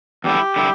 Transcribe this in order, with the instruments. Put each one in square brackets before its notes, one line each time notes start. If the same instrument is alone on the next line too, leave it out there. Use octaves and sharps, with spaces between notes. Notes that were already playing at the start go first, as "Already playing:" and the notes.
[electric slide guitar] E2 D3 G3 E4 [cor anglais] G4
[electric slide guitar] D3 G3 E4